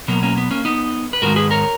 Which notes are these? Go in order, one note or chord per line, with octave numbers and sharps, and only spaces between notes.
B2 F#3 A#3 B3
A#3 C#4
B3
A#3 C#4
B3 D#4
B4
G#2 D#3 G#3 F#4 A#4
G#4 B4
A#4 C#5